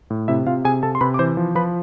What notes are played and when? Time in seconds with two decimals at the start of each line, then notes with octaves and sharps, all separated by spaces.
0.10 A2
0.28 C3 E4 E5
0.47 C3 F4 F5
0.65 C3 G#4 G#5
0.83 C3 A4 A5
0.95 C6
1.01 C3 B4 B5
1.14 D6
1.19 E3 C5 C6
1.37 F3
1.55 F3 B4 B5